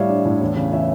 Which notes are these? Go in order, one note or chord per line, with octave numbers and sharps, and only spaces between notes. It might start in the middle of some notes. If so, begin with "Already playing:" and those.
Already playing: A2 G3 C#5 D5 E5 F5
D4
A2
E2
C#3
E3 C#5 E5